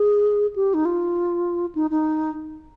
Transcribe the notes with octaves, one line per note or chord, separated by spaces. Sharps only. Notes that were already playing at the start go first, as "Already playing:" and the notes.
Already playing: G#4
G4
D#4
F4
D#4
D#4